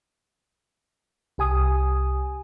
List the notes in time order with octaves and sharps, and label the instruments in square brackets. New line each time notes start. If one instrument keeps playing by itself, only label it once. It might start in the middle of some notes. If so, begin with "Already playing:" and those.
[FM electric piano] C2 G4 G#5 D#6